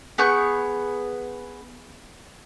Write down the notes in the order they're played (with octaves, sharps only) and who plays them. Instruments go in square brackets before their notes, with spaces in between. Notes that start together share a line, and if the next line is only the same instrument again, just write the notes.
[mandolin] B3 G#4 C#6 G6